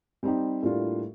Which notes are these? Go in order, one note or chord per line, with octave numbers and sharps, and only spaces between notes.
G3 C4 D#4 G4
A2 G3 A#3 D4 F4